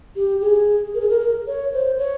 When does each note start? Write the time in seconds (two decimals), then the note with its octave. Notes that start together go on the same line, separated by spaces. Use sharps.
0.16 G4
0.41 G#4
0.95 A#4
1.01 G#4
1.10 A#4
1.20 A#4
1.47 C#5
1.73 C5
1.98 C#5